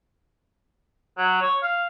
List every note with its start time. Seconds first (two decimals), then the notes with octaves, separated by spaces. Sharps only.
1.18 F#3
1.42 C#5
1.62 F5